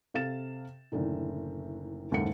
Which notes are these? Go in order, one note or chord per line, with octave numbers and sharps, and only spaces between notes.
C3 A4 F5 A6 E7
F#1 A2 D3 D#3
F#1 D#2 G#2 A4 F#5 C#7